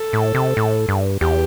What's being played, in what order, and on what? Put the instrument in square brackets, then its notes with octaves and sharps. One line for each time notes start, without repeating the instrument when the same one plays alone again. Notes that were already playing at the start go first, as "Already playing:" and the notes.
Already playing: [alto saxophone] A4
[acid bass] A2
C3
A2
G2
[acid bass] E2 [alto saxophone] G4